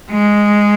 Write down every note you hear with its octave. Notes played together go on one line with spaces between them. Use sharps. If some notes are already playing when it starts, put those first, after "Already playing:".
G#3